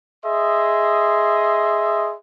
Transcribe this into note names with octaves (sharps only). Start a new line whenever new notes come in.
G#4 D#5 E5 C6